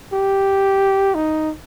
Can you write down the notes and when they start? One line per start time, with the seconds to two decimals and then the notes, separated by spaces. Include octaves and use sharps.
0.13 G4
1.14 D#4